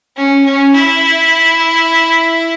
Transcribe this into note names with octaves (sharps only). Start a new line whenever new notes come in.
C#4
C#4
E4